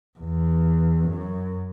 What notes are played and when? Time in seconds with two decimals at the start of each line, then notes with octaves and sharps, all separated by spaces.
0.20 E2
1.09 F#2